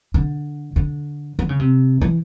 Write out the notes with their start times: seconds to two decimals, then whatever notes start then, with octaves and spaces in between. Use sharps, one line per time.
0.14 D3
0.76 D3
1.39 D#3
1.49 C#3
1.60 C3
2.01 E3